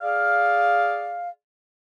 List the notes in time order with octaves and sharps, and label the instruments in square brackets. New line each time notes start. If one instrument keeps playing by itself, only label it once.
[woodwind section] G#4 D5 F5